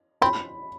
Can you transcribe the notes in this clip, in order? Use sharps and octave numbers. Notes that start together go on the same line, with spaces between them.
C4 B5